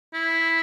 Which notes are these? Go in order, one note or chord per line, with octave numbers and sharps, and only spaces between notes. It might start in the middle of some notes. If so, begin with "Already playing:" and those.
E4